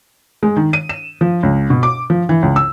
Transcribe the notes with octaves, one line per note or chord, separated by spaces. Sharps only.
G#3
D#3
D#7
E7
F3
C#2
B2
D6
F3
E3
C#2
E6